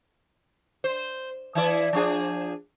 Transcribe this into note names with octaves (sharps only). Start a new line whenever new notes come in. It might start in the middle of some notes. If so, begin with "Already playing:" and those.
C5
E3 E4 D5
F3 D4 G#4